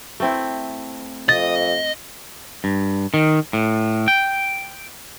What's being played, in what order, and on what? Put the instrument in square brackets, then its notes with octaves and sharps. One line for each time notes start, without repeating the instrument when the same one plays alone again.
[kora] A3 C4 E4
[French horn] F2 [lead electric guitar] D#5 [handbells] A6
[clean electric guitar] G2
D#3
A2
G5